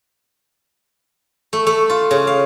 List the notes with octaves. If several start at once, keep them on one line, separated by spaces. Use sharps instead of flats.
A3
A3
F4
C#3
F5